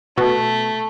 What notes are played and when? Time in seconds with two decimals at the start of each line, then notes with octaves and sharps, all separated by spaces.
0.17 B2 A3